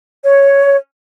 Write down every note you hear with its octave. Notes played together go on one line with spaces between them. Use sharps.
C#5